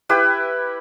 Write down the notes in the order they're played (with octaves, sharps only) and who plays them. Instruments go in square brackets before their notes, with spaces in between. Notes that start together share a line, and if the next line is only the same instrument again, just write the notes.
[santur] E4 G4 B4